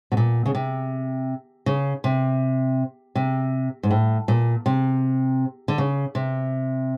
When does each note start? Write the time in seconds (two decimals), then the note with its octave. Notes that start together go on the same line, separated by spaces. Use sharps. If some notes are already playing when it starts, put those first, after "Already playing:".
0.12 B2
0.17 A#2
0.46 C#3
0.55 C3
1.66 C#3
2.04 C3
3.15 C3
3.83 G#2
3.91 A2
4.28 A#2
4.66 C3
5.68 D3
5.78 C#3
6.15 C3